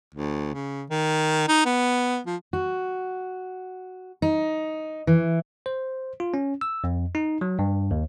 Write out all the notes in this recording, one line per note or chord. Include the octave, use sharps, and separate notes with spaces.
D2
C#3
D#3
D#4
B3
F3
F#4
D#4
E3
C5
F4
C#4
E6
F2
D#4
F#3
G2
D#2